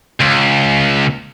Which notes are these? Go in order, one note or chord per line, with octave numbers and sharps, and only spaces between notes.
C#2